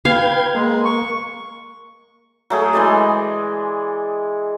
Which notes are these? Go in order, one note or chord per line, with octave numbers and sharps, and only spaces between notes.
B4 F5 G5 G#6
G#3 A#3
C#6
F#3 A3 G#4
E3 G#3 D5 D#5